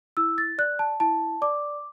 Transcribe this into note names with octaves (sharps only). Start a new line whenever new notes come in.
E4 E6
A6
D5 F#6
A5
E4 A5
D5 D6